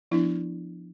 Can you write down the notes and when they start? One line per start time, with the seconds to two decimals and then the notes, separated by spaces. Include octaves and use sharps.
0.11 F3 B3 D4 E4